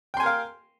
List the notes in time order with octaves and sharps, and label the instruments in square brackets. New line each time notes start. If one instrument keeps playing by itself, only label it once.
[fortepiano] G5
C6
G#5
A#4
F5